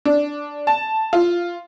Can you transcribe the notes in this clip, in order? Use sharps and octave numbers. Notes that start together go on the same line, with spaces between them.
D4
A5
F4